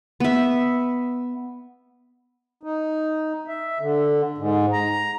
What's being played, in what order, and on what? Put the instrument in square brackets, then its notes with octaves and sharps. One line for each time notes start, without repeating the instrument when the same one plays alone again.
[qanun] B3 E5
[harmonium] D#4
E5
D3
G#2
A#5